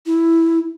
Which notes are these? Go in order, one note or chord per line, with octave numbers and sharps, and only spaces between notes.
E4